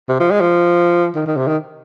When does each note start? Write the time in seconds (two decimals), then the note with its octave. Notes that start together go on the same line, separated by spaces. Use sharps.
0.09 C3
0.20 F3
0.31 G#3
0.41 F3
1.15 D#3
1.26 D#3
1.37 C3
1.47 D#3